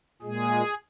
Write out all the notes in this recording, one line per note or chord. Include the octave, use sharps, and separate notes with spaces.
A#2 G#3 G#4